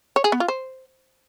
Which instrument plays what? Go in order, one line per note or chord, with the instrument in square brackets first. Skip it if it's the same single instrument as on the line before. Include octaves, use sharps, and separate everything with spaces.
[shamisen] C#5
G#4
B3
F4
C5